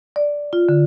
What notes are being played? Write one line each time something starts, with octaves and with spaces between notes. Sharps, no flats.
D5
F4
D3